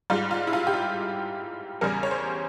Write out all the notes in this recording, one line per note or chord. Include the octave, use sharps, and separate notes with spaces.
G#2 G3 F4
F4
E4
F4
G4
F4
E2 C#3 G3 A#4
C#5
C5